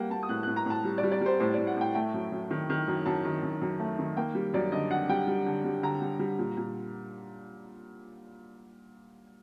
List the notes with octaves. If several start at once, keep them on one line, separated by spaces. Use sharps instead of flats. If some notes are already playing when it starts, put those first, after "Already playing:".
Already playing: G3 A#3 F#5 G5
A#3 A5
D#6
A2 F#6
A2 F#6
A#5
A2 A5
G3
D5
G3
D5
G3 C5
A2 C5
A2 D5
F#5
A2 G5
A3 G5
F#2
F#2
D#3
D#3
F#2
F#2 A5
D#3
F#2
F#2
A3
D#3
A#3 G5
G3
F#2 D5
D3 D#5
D3 F#5
G3 G5
G3
D3
G3
D3 A#5
G3
G3
A#2
A#2